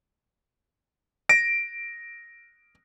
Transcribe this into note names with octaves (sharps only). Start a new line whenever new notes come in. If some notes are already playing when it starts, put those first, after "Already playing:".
A#6 D7